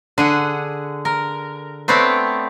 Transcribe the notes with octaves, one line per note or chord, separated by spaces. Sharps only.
D3 G#4 F#5
A#4
A3 B3 C4 C#5 D5